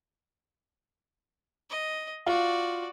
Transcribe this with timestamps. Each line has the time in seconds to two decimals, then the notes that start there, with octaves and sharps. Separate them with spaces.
1.70 D#5
2.26 F4 F#4 D5